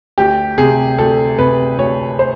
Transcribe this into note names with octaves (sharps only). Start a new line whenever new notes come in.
D2 G4
C3 G#4
D2 A4
C3 B4
D2 C#5
C5